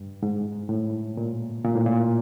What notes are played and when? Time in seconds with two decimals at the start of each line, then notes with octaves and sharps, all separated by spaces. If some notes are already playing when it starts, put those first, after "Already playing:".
Already playing: G2
0.23 G#2
0.69 A2
1.17 A#2
1.65 A#2
1.75 A2
1.86 A#2